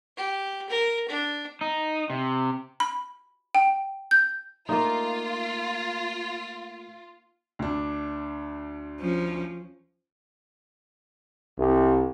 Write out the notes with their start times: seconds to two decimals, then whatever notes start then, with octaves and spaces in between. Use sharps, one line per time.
0.17 G4
0.69 A#4
1.08 D4
1.61 D#4
2.10 C3
2.80 B5
3.55 G5
4.11 G6
4.69 A3 A#3 D#4 F4
7.59 D2 D4
9.01 F3 C#4
11.59 C2